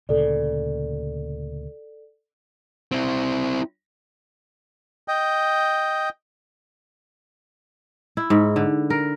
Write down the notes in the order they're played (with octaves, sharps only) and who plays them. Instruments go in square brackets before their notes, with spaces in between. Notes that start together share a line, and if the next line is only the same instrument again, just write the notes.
[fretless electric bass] D2 A#2 C#3 [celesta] A4 D5
[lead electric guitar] C4 E4
[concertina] D#5 G5
[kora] E4
G#2
D3
A#4